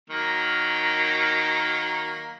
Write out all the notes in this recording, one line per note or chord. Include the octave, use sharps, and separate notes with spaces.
D#3 F#3 A#3